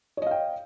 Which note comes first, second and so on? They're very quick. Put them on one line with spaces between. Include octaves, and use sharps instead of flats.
C#5 D#5 F5 G5